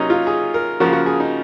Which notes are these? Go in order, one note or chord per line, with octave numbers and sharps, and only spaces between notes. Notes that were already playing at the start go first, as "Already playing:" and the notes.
Already playing: C3 F#3 A#3 C#4 D#4
F4
G#4
A#4
C#3 F3 A#3 F#4
F#4
G#4
D#4